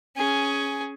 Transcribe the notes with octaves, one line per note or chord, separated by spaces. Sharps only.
C#4 G#4